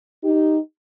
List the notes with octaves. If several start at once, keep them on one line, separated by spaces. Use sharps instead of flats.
D#4 G4